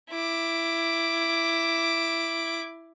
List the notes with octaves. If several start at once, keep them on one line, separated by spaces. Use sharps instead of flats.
E4 D6